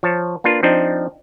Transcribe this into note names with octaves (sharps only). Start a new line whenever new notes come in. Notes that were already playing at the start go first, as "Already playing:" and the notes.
F3 C#5 A5
A#3 D4 F4 B4
F3 C4 D4 D#4